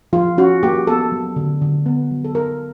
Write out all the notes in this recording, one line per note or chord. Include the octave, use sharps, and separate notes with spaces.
F3 F4
C#4 F#4
A#3 G4
B3 A4
F#3
D3
D3
B3
F#3
A4
B3 A#4